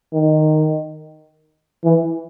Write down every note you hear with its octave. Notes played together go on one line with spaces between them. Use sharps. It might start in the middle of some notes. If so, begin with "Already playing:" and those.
D#3
E3